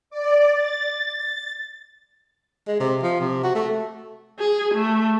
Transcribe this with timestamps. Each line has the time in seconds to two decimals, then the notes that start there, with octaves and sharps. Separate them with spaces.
0.10 D5
0.57 A6
2.67 G#3
2.80 C3
3.03 F3
3.20 C3
3.43 F#4
3.55 A3
4.39 G#4
4.75 A3